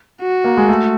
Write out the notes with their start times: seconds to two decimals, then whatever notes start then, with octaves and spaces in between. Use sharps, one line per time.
0.22 F#4
0.44 A#3
0.57 G#3
0.68 A3